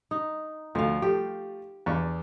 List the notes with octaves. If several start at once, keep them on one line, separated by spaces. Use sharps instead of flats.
D#4
D2 F3 A3 F5
F3 A3 G4
E2 D4 C#6